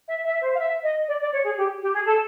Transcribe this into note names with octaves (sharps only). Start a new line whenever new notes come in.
E5
E5
C5
F5
E5
D#5
D5
D5
C#5
G#4
G4
G4
G#4
A4